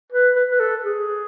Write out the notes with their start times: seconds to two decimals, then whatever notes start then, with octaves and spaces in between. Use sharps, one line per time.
0.12 B4
0.36 B4
0.51 B4
0.60 A4
0.84 G#4